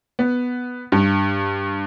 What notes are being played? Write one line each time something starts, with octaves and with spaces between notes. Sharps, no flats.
B3
G2